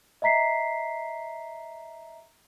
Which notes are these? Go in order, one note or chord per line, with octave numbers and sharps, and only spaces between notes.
D#5 E5 A#5 B6 C7